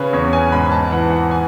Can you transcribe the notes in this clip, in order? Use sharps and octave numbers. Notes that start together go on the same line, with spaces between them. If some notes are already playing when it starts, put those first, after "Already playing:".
Already playing: C#3 B4 C#5
E2 C#5
G#5
G#2 B5
A5
E3 F#5
F#5
G#5